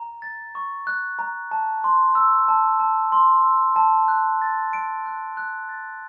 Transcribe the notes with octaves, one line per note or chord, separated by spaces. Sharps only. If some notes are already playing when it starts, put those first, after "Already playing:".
Already playing: A#5
A6
C#6
F#6
A#5
A5
C6
E6
A5
A5
C6
E6
A5
F#6
A6
D7
F#6
F#6
A6